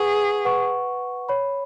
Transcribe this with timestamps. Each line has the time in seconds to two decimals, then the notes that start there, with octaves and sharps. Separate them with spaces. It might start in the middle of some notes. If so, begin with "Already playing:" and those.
Already playing: G#4 B4 F#5 C#6
0.45 B4 F#5 C#6
1.29 C#5 B5